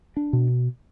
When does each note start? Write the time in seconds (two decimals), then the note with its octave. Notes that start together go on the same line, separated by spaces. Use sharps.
0.17 D4
0.33 B2